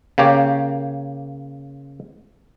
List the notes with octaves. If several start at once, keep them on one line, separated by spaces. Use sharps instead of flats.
C#3 A#3 G4 C#5